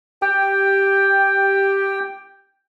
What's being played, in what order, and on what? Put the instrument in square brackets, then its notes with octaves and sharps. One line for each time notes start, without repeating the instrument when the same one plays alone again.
[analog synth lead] G4 [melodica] G5